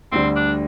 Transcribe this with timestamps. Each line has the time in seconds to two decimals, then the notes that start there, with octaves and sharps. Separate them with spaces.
0.12 D2 D3 G3 C4
0.36 D4